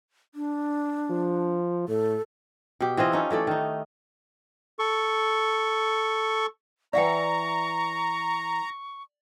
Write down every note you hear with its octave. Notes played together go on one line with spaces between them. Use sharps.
D4
F3
A2 A4
B2 G4
E3 C4 F4 D#5
C#4 D#4 A4
E3 A3 A4 D5
D#3 D#4
A4 C#6
E3 E4 D5 E5 F#5 G5 A#5 C#6